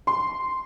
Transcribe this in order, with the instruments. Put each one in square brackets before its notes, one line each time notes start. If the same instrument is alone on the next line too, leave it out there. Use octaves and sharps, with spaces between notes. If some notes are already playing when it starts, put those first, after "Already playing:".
[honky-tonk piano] C6